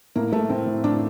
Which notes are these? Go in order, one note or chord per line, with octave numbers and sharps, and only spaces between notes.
A2 A#3
A2 A3
A2 C4
A2
A2 D4